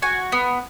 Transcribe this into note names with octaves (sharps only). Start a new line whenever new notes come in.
F#4 G#5
B3